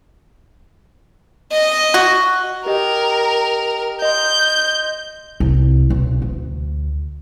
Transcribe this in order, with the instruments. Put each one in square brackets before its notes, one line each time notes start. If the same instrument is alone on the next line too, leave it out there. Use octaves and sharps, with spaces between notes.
[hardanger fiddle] D#5
[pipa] F#4
[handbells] G4 D#5 G5 [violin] A#4
[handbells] D#5 C6 [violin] G6
[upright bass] C2
B1
D2